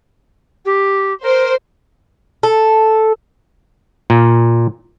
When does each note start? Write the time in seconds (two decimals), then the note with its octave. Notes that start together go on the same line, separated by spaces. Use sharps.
0.65 G4
1.22 A#4 C5
2.43 A4
4.10 A#2